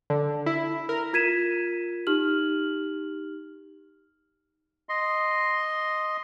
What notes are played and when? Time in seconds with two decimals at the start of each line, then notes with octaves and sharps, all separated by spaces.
0.10 D3
0.46 E4
0.89 A#4
1.13 F4 A#4 G#6 B6 D#7 E7
2.07 D#4 G4 F6 F#7
4.89 D#5 C6